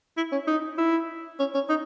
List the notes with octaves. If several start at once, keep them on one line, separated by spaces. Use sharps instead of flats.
E4
C#4
D#4
E4
C#4
C#4
D#4